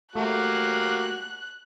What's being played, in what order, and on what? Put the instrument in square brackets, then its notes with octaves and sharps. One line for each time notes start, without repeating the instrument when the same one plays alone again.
[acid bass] A3 [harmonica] A#3 F#4 G4 [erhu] F#6